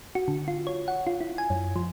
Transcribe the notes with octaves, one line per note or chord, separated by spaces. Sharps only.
F#4
D3
F4
C#5
F#5
F4
E4
G#5
F#2
F3